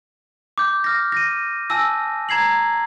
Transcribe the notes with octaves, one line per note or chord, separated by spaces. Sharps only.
D6 G6
D#6 F6 A#6
A#6 D#7
G#5 A5 E6 A#6
A#5 G#6 C7 F#7